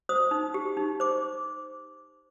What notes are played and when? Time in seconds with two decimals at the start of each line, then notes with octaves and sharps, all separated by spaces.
0.09 C5 D#6
0.31 D#4
0.54 G4
0.77 D#4
1.00 C5 D6